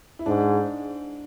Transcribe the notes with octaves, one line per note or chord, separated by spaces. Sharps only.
E4
G#2 D4